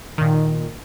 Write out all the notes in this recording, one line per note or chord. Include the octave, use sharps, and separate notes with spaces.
A#2 D#3